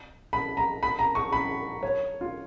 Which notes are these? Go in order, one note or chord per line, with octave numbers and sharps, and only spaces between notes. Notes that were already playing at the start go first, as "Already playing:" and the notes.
B5
A#5
B5
A#5
C#6
B5
C#5
F4